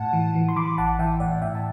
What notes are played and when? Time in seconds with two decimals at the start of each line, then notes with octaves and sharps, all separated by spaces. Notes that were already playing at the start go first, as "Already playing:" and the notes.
Already playing: A2 F#5 A5
0.13 E3
0.35 E3
0.49 C6
0.56 E3 B5 D6
0.78 A1 F#5 A5
0.99 E3 E5 G5
1.20 A2 D5 F#5
1.42 A2 E5 G5
1.55 A5